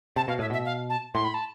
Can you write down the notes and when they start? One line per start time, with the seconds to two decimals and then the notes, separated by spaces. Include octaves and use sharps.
0.16 C3 A5
0.28 B2 F5
0.39 A2 E5
0.50 B2 E5
0.65 F5
0.90 A5
1.14 A2 C6
1.24 B5
1.34 A5